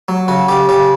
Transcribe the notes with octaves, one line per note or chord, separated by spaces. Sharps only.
F#3
C#3 F#4
C#3 G4
C#3 G4